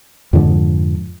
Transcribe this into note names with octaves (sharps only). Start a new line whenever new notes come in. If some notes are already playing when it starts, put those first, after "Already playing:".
F2 G#2 D3 F3